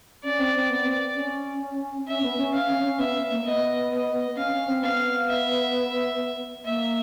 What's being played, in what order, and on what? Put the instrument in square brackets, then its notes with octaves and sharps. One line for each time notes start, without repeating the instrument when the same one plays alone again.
[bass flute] C#4 [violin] D5
[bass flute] C4
C4
B3
C4
C#4
[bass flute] C#4 [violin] E5
[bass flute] B3
C#4
[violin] F5
[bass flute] C#4
C#4
[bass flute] B3 [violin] E5
[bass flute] A#3
[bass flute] B3 [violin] D#5
[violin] D#5
[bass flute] C#4 [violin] F5
[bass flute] C#4
C4
[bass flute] B3 [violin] F5
[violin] E5
[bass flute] A#3 [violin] E5